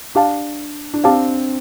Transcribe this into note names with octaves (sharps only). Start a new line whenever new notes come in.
D4 G4 F5 A5
D4
C4 G4 F5 A5